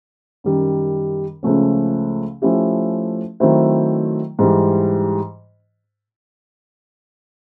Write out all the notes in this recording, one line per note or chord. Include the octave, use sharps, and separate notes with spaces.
F#2 D#3 G3
C#2 C#3 F3 A3 C#4
F3 A3 C#4 E4 G4
D#3 F#3 A3 C4 E4
G#2 E3 G3